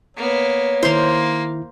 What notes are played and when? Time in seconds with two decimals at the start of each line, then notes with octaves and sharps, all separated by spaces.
0.17 A#3 B3 C#5
0.83 D#3 A#3 E4 C5 C6